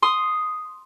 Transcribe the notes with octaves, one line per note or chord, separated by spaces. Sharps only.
C6 D#6